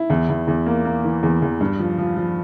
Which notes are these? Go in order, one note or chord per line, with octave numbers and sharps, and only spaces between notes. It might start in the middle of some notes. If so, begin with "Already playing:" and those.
Already playing: E4
E2
E2
E2
A#3
A#3
E3
E2
E2
G2
F3
F3
F3